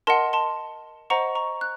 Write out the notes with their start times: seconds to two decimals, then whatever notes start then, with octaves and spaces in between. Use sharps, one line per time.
0.07 A#4 D#5 F#5 A5 C6
0.33 A5 C6
1.10 C5 D#5 F#5 A#5 C#6
1.35 A#5 C#6
1.61 F#6